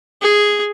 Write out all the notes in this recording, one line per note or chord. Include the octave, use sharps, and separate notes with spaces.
G#4